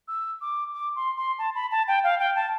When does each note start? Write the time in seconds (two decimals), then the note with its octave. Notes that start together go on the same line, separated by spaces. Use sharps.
0.08 E6
0.41 D6
0.74 D6
0.96 C6
1.17 C6
1.39 A5
1.55 B5
1.71 A5
1.88 G5
2.04 F5
2.19 G5
2.36 A5